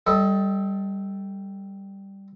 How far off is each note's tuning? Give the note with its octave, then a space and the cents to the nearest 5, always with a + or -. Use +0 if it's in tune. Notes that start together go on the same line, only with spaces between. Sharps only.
G3 +0 A4 +0 D#5 +30